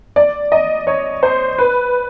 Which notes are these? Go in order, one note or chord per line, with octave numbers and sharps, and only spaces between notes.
D5
D#5
C#5
C5
B4